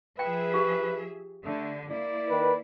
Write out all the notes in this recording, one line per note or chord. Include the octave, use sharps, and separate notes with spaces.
F3 G#4 B4 E5 G5
G4
D3 A3
A#3 E4 D5
D#3 B4